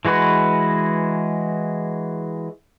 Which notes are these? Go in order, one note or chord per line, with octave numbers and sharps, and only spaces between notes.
E3 G#3 F#4 B4